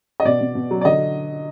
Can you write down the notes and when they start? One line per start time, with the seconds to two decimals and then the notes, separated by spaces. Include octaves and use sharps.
0.20 D#5
0.25 B2 D5
0.41 B2
0.55 B2
0.71 F#3
0.81 D5
0.85 D3 D#5